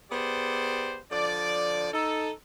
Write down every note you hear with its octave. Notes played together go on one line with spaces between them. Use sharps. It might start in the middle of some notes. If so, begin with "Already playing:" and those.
B3 G4 G#4 C5 D5
D3 F3 D5
D#4 A4